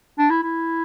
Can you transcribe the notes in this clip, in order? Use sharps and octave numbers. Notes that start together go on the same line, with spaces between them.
D4
E4
E4